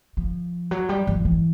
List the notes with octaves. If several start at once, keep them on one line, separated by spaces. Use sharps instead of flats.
F3
F#3
G3
F3
E3